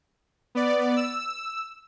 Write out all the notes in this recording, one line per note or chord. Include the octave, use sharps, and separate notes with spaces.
B3 D5
E6